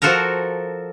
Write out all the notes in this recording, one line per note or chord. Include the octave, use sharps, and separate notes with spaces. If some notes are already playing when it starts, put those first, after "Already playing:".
F3 F#4 A4 A#4 A#5